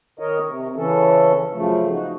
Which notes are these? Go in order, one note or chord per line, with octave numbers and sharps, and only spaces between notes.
D#3 A#4 C#5 D#5
C3
C#3 E3 C#4 A4
F#2 C#3 F3 A3
D#4 F#4